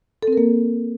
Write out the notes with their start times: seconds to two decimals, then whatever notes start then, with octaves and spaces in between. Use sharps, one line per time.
0.23 A4
0.28 C4
0.32 A#4
0.37 A#3